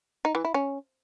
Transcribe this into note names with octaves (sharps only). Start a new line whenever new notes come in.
D#4
E3
E4
C#4